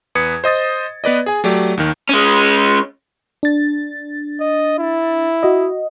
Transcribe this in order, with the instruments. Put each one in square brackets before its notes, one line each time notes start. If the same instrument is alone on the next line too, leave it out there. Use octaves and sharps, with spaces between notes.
[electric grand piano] E2 B4 D#6 G#6 C#7
C5 D#5 D#6 A6
B3 B4 D5 D#5
G#4 G#5
F#3 A3 G4 D5
D#2 D#3
[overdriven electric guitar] G#3 C#4
[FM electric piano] D4 A6
[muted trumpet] D#5
E4
[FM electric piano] F#4 D#5